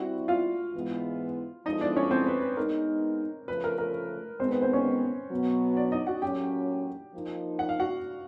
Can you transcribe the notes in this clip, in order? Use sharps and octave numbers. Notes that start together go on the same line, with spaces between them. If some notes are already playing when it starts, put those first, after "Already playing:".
Already playing: G3 C4 E4 F#4 F#5
F4 F5
G#2 E3 G#3 B3 E4
F3 G#3 B3 D#4 E4 A4 D#5
D4 D5
C#4 C#5
C4 C5
B4
B4
G#3 B3 D#4 A#4
C#3 F3 A3 B4
A#4
A#4
D#3 G#3 B3 C4 C5
B4
C4 C5
C#4 C#5
B2 F#3 B3
D4 D5
D#4 D#5
F#4 F#5
A2 F#3 A#3 C#4 G4 G5
F3 A#3 D#4
F#5
F5
F#4 F#5